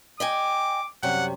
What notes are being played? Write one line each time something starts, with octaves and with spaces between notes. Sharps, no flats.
D#5 G5 G#5 D6
F#2 C3 G3 F#5